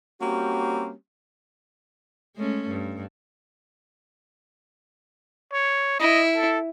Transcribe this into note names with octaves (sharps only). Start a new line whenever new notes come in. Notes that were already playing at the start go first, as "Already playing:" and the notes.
G3 A#3 C4 C#4 F#4 G4
G#3 A3 C#4
G2
C#5
E4 D#5
A4